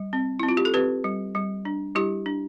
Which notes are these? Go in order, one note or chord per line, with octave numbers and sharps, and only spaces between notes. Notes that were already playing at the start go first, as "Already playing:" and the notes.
Already playing: G3
C4
E4
C4
F4
G4
A4
C4 G4 B4
G3
G3
D4
G3 E4 G4
D4